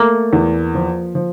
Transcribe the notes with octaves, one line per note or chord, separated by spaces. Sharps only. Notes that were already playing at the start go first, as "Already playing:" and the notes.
Already playing: A3 A#3
E2
F3
F3